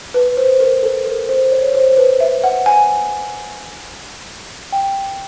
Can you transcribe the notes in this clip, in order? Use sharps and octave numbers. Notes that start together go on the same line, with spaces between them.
B4
C5
A#4
A4
A#4
C5
C#5
C5
B4
E5
F#5
G#5
G5